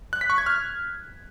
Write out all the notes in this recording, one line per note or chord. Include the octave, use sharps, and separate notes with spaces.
F#6
B6
C#6
G#6
F6